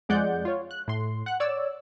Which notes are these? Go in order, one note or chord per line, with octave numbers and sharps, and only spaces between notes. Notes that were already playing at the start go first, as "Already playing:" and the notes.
F2 G#3 D5 F#5 G6
F4 C#5
F#6
A2 C6
F#5 F#6
C#5 D5 E6